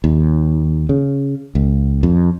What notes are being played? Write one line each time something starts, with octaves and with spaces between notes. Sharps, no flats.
D#2
C#3
C#2
F2